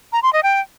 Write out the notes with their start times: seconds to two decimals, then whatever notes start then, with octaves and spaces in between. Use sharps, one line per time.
0.12 A#5
0.23 C6
0.33 D#5
0.43 G5